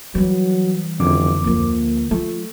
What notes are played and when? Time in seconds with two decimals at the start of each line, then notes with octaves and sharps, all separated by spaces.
0.15 E3 F#3 G3
1.00 F#1 F2 D3 D6
1.44 D2 F3 A#3
2.11 F3 A3